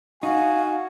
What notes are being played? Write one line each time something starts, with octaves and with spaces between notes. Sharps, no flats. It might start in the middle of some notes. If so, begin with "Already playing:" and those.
D#4 F#4 F5 G#5